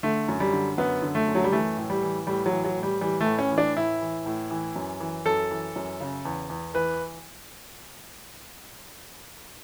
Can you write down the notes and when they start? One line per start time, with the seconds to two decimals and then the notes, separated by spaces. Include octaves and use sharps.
0.03 D3 A3
0.28 F#2
0.40 G3
0.53 D3
0.78 F#2 B3
1.02 D3
1.15 A3
1.28 F#2
1.35 F#3
1.44 G3
1.52 E3 A3
1.77 A2
1.90 G3
2.02 E3
2.27 A2 G3
2.46 F#3
2.52 E3
2.65 F#3
2.76 A2
2.83 G3
3.01 E3 G3
3.21 A3
3.27 A2
3.39 C#4
3.51 E3
3.58 D4
3.76 A2 E4
4.01 E3
4.26 A2
4.51 E3
4.76 F#2
5.00 E3
5.25 F#2 A4
5.51 E3
5.76 F#2
6.01 C#3
6.25 E2
6.50 E2
6.74 E3 B4